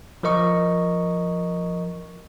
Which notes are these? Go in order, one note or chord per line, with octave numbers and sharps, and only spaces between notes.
F3 A#4 D#5 C#6